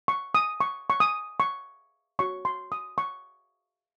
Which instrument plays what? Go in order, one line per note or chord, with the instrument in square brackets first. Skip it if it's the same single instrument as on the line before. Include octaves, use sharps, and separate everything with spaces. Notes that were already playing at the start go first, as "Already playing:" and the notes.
[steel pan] C#6
D#6
C#6
C#6
D#6
C#6
F#4 C#5 C#6
C6
D#6
C#6